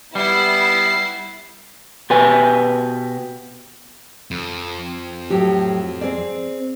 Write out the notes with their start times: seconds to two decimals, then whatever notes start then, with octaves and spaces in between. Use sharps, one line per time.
0.15 G3 B3 E4 C7
2.10 B2 G4 B4 G#5
4.31 F2
5.30 A2 F#3 G4
6.01 C4 G#4 D5